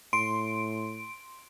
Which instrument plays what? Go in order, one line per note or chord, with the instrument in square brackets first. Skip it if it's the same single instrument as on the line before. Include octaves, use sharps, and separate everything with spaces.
[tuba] A2 [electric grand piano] C6 [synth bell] D7